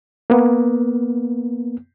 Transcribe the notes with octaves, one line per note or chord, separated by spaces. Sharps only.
A#3 B3